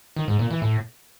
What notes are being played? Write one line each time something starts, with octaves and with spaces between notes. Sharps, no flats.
D#3
G#2
A#2
E3
A2